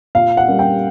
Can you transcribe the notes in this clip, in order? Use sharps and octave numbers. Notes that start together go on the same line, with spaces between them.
A#2 F5
F#5
G3 A#3 C#4
G5